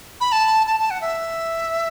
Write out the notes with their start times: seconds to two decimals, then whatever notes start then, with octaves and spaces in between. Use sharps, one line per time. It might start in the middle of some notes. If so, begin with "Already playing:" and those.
0.20 B5
0.32 A5
0.67 A5
0.79 A5
0.90 F#5
1.01 E5